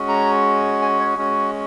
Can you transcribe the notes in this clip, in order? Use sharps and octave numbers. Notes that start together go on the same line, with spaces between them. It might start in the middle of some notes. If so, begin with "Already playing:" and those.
Already playing: G#3 C#4 F#4
A#5
G#5
C#5
G#3 C#4 F#4